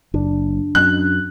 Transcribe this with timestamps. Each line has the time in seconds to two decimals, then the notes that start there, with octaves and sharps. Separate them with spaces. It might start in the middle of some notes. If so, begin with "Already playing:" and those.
0.14 F#1 D4
0.75 F#2 F#6